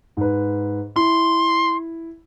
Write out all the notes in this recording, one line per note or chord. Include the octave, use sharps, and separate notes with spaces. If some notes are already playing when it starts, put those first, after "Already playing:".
G#2 B4
E4 C6